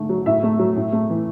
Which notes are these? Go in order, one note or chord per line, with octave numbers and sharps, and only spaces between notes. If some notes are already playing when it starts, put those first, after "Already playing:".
Already playing: G#2 D3 A3
F#3
A2 E5
A3
F#3
A2
A3
E3